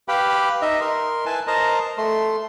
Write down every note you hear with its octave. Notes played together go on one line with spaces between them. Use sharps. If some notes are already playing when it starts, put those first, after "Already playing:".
G4 B4 F5 G5 B5
D#4 D#5 E5
A#4 C6
E4 B4 G#5 A5
A#4 C5 D#5 A5 A#5
A3 C6